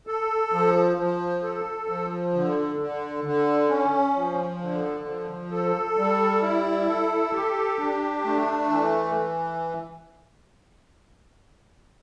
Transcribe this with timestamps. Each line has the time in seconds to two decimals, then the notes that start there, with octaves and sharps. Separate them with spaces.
0.07 A4
0.52 F3
0.97 F3
1.43 A4
1.88 F3
2.34 D3
2.79 D3
3.24 D3
3.69 C#4
4.15 F3
4.61 D3
5.06 F3
5.51 A4
5.97 G3
6.42 E4
6.88 A4
7.33 G4
7.79 D4
8.24 A3
8.69 E3